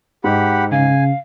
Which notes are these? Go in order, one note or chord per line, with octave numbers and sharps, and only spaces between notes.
G#2 G4 F#5 B5
C#3 F5 G#5